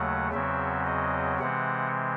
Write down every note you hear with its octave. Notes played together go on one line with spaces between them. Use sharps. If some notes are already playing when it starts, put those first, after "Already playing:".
Already playing: D#2 C#3 F#3 A3 F#5
E2 C#3 F#3 C4 E5
D#5
C3 E3 G#3 C4 F#5